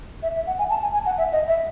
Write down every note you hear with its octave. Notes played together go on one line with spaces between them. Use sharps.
E5
E5
F#5
G#5
A5
G#5
G#5
F#5
E5
D#5
E5